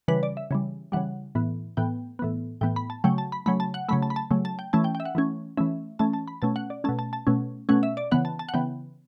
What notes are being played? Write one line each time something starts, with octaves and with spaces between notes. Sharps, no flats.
C#3 E3 G3 B4
D5
E5
C#3 E3 G3
C#3 E3 G3 F#5
A2 E3 B3
A2 E3 B3 G5
A2 E3 B3
A2 E3 B3 G5
B5
A5
C#3 F#3 A3 G5
A5
B5
C#3 F#3 A3 B5
A5
F#5
C#3 F#3 A3 B5
A5
B5
A5
C#3 F#3 A3
A5
G5
E3 A3 C#4 A5
G5
G5
E5
F#5
E3 A3 C#4
E3 A3 C#4 E5
E3 A3 C#4 A5
A5
B5
B2 A3 C#4 A5
F#5
D5
B2 A3 C#4 A5
A5
A5
B2 A3 C#4
B2 A3 C#4 F#5
E5
D5
C#3 E3 B3 F#5
A5
A5
F#5
C#3 E3 B3 G5